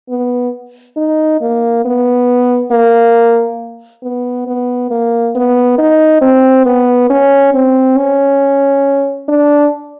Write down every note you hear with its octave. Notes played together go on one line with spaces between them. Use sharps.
B3
D#4
A#3
B3
A#3
B3
B3
A#3
B3
D#4
C4
B3
C#4
C4
C#4
D4